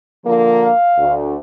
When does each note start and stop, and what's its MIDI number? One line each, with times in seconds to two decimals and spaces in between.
0.24 0.69 50
0.24 0.69 53
0.24 0.69 58
0.64 1.14 77
0.97 1.34 38